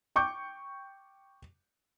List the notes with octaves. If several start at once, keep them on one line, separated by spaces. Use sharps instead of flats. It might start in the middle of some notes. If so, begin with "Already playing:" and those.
G5 C#6 D6 G6